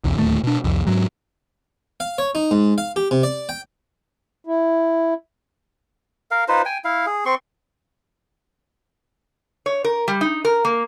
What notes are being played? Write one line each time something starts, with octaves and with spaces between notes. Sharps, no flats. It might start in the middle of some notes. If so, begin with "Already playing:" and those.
B1 E2
D1 D#2 A3
B2 D4
C2 F2
G#2 F#3
F5
C#5
D#4
G#2
F5
G4
C3
D5
G5
E4
A#4 F5
D#4 F4 B4 C5
G5 G#5
E4 F5
G#4
C4 C6 C#6
C#5
A#4
G3
D#4
A#4
A#3